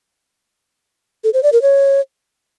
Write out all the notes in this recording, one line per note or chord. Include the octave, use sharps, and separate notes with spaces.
A4
C5
D5
A#4
C#5